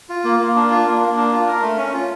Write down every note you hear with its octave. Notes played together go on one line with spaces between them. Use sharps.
F4
A#3
A#3
D4
F4
A#3
A#3
D4
F4
A#4
A3
C#4
F4